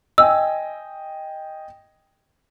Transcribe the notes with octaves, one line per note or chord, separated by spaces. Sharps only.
D#5 G5 G#5 E6